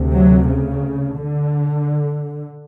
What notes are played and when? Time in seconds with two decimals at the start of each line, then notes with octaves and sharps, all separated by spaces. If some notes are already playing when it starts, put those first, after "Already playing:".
Already playing: D2 C3
0.15 F#3
0.49 C#3
1.17 D3